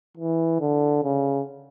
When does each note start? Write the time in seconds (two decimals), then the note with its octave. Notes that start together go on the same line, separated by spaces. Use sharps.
0.17 E3
0.61 D3
1.04 C#3